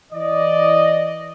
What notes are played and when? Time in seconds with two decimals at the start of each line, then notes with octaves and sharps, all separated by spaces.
0.13 E3 D5 D#5